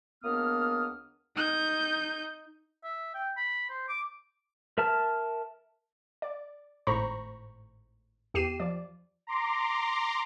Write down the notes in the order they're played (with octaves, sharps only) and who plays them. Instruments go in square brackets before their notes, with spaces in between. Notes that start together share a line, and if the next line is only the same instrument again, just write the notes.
[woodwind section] C#2 A#3 B3 D4 D#6 F6
[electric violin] D#4 G6
[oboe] E5
G5
B5
C5
D6
[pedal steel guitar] A#4 E5 A5 F6
[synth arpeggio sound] D5
G#1 A2 C5 A#5 B5 C#6
E2 G4 C7 D#7 E7
F3 D5
[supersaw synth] A#5 C6 D6